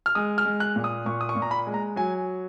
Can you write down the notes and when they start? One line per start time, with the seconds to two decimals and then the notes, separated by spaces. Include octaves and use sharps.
0.06 F6
0.15 G#3 D#6
0.38 F6
0.45 G#3
0.60 F#6
0.76 A#2
0.84 D#6
1.06 A#2 C#6
1.21 D#6
1.29 C#6
1.36 A#2
1.42 A#5
1.51 B5
1.67 G#3
1.74 A#5
1.96 F#3 G#5